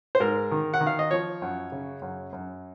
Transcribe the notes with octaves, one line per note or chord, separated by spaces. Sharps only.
C5
G#2 A#4
D#3
F#5
D#3
F5
D#5
F3 C#5
F#2
C#3
F#2
F#2